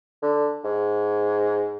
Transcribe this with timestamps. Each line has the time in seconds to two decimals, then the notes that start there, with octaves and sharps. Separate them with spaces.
0.22 D3
0.65 G#2